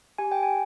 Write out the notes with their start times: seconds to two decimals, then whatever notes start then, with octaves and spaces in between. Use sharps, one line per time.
0.18 G4 G#5
0.32 G5
0.43 G#5